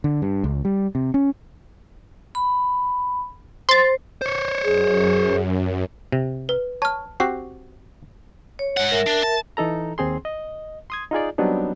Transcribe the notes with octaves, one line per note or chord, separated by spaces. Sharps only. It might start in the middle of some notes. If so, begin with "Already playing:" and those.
D3
G2
C#2
G3
C3
C#4
B5
C5 C6 A6
C5 C#5
F#2 G#4
C3
B4
C#5 A5 F6
C4 F#4 G4 C7
C#5
G#2 F#5
A#4 E5
D4
A5
E3 D#4 A4 A#5
D#2 C4 G#4 C6
D#5
C6 D#6 G#6
D#4 F4 G#4 D5
F#3 G3 B3 C4 D4 D#4